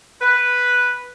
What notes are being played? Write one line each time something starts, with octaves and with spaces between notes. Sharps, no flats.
B4